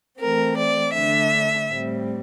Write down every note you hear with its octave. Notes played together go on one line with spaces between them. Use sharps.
E3 A3 C4 A#4
D5
D3 A3 D4 E5
A2 G3 C4